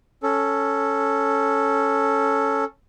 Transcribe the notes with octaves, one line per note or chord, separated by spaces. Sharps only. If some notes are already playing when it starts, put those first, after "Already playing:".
C#4 A4